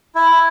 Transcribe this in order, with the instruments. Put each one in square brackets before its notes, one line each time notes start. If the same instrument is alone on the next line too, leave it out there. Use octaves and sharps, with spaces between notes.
[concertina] E4